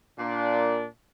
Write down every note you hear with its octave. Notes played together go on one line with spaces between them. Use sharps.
A#2 D4